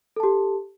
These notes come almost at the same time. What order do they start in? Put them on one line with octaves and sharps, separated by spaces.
A4 A5 G4